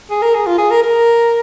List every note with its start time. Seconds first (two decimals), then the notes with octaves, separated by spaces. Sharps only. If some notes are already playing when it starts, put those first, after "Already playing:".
0.10 G#4
0.22 A#4
0.34 G#4
0.47 F4
0.58 G#4
0.71 A#4
0.83 A#4